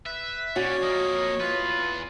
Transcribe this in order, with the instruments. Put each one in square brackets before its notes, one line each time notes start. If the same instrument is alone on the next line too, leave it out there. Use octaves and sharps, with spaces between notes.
[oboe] B4 [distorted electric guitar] E5
[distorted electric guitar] C#3 [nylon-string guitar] F#4 [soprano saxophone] C#5 [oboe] D5
[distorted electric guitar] F2 A#3 [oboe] D#5
[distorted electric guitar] E2 B4 [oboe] F4